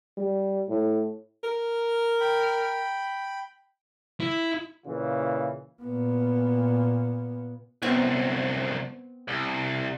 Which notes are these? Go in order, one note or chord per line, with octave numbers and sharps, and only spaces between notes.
G3
A2
A#4
G5 B5
E4
A#2 C#3 E3 F4
A#2 B3
C2 F#2 B3 C4 C#6
C2